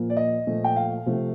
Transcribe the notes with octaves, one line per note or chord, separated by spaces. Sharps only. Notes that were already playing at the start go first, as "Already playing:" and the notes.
Already playing: A#2 F3 A#3
D5
D#5
A#2 F3 A3
G5
F5
C3 F3 A3